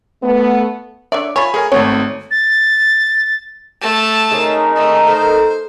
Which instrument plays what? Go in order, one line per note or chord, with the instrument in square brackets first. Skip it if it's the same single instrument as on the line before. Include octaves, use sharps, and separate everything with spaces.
[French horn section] A3 B3
[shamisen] D4 C#5 D5 [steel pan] E5
[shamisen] F4 C#5 [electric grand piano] G#5 B5
[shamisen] A3 [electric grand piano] G#4 A#4 G#5
[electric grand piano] G#1 A3 C4 [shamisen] B3 [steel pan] C#5
[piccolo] A6
[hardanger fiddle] A3 A5
[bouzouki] C4 C#4 G#4 [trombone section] D#4 A#4
[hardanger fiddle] A3
[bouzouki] A4 [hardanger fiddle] C5